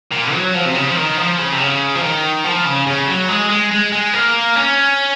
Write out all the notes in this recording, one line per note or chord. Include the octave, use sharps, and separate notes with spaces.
A#2
F#3
F3
C3
C#3
F3
D#3
F3
C#3
C3
C#3
F3
D#3
F3
C#3
C#3
F#3
G#3
G#3
G#3
G#3
A#3
C#4